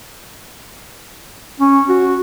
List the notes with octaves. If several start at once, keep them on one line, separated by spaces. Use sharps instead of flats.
C#4
F#4